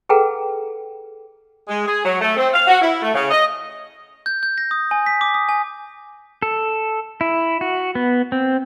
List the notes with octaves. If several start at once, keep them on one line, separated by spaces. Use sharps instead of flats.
G#4 A4 B4 F#5 G5 A#5
G#3
G#4
F#3
A3
C4
F5
F#4
E4
A3
C#3
D#5
G6
G6
A#6
D#6
G#5
B6
D6
D#6
G#5
A4
E4
F#4
B3
C4